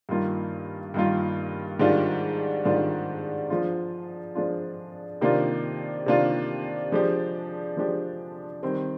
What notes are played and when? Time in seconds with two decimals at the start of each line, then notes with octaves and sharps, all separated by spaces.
0.09 G2 D#3 A#3 F4
0.94 G2 D#3 A#3 F4
1.80 G#2 D#3 G3 D4 F4
2.65 G#2 D#3 G3 D4 F4
3.50 F3 G#3 D4 F4
4.35 F3 G#3 D4 F4
5.21 C3 D#3 A#3 D4 F4
6.06 C3 D#3 A#3 D4 F4
6.92 F3 G#3 D4 G4
7.77 F3 G#3 D4 G4
8.63 D#3 G3 C4